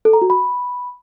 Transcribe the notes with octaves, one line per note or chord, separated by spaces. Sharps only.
A4
A#5
F#4
B5